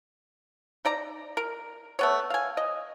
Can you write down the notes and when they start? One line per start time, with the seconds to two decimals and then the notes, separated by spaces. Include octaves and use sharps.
0.85 D#4 D5 A#5
1.37 A#4
1.99 A3 B3 C#5
2.30 F5 G#5
2.57 D#5